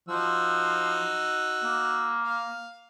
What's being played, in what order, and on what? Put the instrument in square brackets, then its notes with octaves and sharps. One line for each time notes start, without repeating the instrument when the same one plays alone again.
[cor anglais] F3 [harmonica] D#4 F#4 E6
[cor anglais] A#3
[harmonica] F5